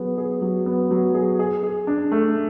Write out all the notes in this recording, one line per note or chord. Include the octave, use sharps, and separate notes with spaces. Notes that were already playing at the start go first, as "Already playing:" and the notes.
Already playing: F#3 B3 G#4
G#4
F#3
B3
F#3
G#4
G#4
G#4
D4
A3